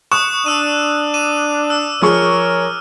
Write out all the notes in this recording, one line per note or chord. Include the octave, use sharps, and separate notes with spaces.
C#6 D#6 F#6 E7
D4 E6 D#7
D6 D#7 E7
E6
F3 G#4 A#4 C#5 C#6 E6 F6